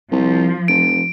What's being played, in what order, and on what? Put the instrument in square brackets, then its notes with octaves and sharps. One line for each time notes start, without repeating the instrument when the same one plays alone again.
[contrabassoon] C2 [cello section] F3
[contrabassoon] F1 [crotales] D7